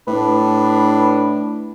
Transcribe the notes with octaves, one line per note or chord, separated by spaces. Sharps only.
A2 D4 B4